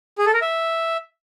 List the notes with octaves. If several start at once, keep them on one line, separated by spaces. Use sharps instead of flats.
G#4
A4
A#4
E5